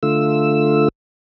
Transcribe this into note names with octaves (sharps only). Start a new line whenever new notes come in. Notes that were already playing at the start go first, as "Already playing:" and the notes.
D3 A3 F4 E6